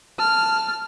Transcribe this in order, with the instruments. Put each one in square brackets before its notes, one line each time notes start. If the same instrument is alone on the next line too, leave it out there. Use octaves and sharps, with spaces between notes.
[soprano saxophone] A5 [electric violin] F6